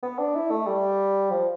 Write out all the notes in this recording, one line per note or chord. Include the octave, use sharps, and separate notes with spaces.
B3
D4
E4
A3
G3
F3